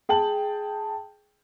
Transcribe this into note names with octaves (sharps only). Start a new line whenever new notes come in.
G#4 G5 A5 F#7